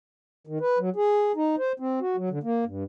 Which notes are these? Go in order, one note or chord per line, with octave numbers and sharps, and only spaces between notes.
D#3
B4
F#3
G#4
D#4
C5
C4
F#4
F#3
D3
A#3
G2